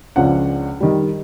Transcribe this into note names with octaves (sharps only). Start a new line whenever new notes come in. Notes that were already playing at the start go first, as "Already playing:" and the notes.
C#2 F3 C#4 D4 F#5
D#3 G3